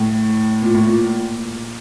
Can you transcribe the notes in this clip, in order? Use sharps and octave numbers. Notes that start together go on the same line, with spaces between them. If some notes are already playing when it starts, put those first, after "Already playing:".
Already playing: A2
A#2
A2
A#2